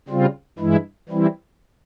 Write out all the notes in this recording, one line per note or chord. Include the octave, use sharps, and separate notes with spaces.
C#3 G3 C4 F4
G2 E3 G#3 E4
E3 G3 C4 E4